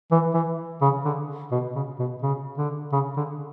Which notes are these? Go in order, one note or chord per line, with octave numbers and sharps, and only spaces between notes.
E3
E3
C#3
D3
B2
C#3
B2
C#3
D3
C#3
D3